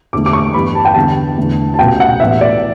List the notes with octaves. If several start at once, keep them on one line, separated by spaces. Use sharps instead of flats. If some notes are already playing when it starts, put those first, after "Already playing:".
E2 D3 A3 D6
D6
C#6
G2 E3 G3 B3 B5
A5
G5
E2 D3 G3 B3 A5
E2 D3 A3
A5
C#2 B2 F#3 A3 G5
F#5
A2 E3 B3 E5
D5